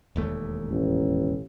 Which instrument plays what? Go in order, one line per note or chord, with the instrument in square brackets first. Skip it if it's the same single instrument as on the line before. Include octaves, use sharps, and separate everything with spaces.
[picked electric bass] E1 D#2 A3
[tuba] A1